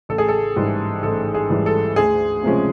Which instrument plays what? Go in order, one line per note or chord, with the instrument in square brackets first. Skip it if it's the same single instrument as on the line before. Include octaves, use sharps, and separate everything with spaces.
[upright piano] A1 A4
G#4
A4
G#2 E3 G3
A1 A4
G#4
G#2 E3 G3
A4
D2 G#4
C3 F3 G#3 C#4